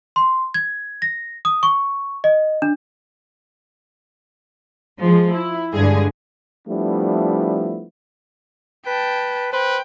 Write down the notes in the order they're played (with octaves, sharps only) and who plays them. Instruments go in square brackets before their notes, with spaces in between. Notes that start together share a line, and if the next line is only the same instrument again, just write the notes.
[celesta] C6
G#6
A#6
D#6
C#6
D#5
D4
[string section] F3 G#3
E4
G2 D3 G#3 G#4
[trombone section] F3 G3 A3 B3 D4 E4
[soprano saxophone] B4 [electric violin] G5 A5
[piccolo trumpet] B4 [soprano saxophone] C5 [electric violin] G5